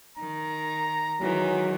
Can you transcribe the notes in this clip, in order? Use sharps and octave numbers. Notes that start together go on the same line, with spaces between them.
D#3 A#5
D#3 E3 F#3 G#3